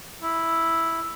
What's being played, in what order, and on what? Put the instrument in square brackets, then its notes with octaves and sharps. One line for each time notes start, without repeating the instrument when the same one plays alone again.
[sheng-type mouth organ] E4